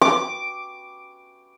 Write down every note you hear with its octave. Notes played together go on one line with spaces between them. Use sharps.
D6